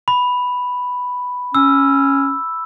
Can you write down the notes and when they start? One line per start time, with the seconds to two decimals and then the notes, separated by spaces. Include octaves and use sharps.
0.08 B5
1.55 C#4 E6